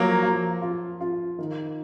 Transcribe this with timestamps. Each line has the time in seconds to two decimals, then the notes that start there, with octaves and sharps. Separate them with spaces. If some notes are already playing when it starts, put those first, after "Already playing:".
Already playing: F3 F#3 A#3
0.23 F3
0.62 F4
1.01 F4
1.39 D#3